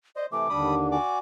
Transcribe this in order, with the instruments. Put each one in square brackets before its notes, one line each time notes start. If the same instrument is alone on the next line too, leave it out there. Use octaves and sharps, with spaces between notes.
[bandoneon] C5 D#5 [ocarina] D5
[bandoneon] C3 E3 A3 [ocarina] D6
[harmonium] D#2 D3 D4 [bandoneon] G3 B5 D#6
[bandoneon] F#4 D5 D6 [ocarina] G#5